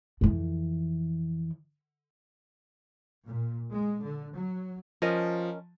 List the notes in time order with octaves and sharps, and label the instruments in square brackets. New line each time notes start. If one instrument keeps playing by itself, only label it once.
[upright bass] F2 E3
[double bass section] A#2
G#3
D3
F#3
[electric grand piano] F3 [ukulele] C#4 A#4 D#5